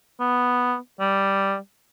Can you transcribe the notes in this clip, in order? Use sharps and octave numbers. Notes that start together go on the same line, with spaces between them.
B3
G3